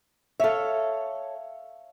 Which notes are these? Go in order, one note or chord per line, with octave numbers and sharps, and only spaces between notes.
A4 C#5 E5 F5